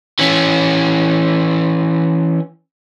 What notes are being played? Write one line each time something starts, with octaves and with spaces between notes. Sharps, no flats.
E3 C#4